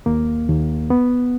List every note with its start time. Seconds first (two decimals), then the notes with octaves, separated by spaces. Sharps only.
0.06 D#2 A#3
0.48 D#2
0.90 B3